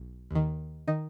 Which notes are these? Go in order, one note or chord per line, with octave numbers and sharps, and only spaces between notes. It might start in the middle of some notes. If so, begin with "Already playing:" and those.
Already playing: B1
D#2 D#3
D#3 D#4